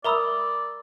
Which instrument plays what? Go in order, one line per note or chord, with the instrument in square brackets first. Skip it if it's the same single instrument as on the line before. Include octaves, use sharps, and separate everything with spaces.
[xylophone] A#4 A#5 D#6 [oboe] D5 [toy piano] E5 B5 E6